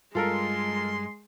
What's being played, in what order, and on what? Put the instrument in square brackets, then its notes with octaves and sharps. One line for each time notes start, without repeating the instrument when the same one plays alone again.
[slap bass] G2 G3 [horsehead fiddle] G#3 [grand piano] F4 A4 A#4 [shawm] C6